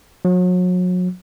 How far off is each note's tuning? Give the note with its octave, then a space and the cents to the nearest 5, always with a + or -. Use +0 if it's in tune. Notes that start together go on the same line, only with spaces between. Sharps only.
F#3 -35